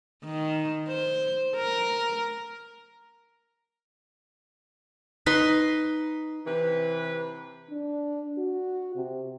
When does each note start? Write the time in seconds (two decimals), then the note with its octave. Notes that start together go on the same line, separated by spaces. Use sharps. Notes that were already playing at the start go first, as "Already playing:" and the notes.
0.25 D#3
0.88 C5
1.56 A#4
5.26 D#4 B4 B5 C6
6.46 C3 E3 B4
7.70 D4
8.38 F#4
8.96 C3